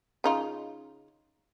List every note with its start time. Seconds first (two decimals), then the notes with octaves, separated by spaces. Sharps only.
0.24 C#3 D#4 F4